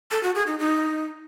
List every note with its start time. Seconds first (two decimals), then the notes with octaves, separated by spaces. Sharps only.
0.11 A4
0.23 F#4
0.35 G#4
0.47 D#4
0.59 D#4